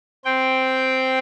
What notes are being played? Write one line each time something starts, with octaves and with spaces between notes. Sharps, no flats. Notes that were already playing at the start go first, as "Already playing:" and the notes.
C4 G5